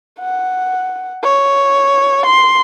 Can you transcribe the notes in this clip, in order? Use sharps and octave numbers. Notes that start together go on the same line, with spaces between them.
F#5
C#5
C6